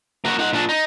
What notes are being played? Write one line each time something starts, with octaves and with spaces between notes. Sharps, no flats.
A#3 F#4
D#4 F#5
A#2 D4
D#4